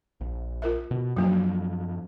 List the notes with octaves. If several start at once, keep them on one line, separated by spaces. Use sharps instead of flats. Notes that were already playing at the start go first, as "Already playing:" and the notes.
A#1
F4 A#4 E5
B2
F#2 F3 F#3 A#3 D4 F#4